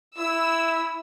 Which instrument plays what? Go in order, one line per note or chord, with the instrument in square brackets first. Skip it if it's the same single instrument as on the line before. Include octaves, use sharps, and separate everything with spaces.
[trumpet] E4 [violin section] E6